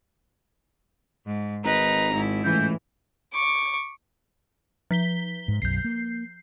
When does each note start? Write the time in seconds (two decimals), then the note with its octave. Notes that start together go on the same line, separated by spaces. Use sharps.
1.26 G#2
1.64 G#1 D#4 B4 A#5
2.14 G#2 E4
2.44 C#2 A2 E3 G6
3.34 C#6 D6
4.91 F3 B6 G7
5.48 G#2
5.62 B1 F#2 G6 C7
5.84 A#3